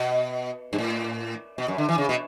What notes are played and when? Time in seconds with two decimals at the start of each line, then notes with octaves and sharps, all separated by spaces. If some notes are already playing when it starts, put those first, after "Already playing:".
Already playing: B2
0.73 G2
0.78 A2
1.58 B2
1.68 F#2
1.78 D3
1.89 E3
1.98 C#3
2.09 B2